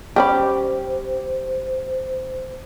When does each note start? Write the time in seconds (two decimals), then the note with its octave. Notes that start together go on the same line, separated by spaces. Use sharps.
0.16 G3 C#4 G4 C5 B5